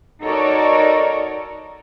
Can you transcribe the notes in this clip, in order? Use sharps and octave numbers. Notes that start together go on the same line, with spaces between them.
D#4 F#4 A4 A#4 C#5 D5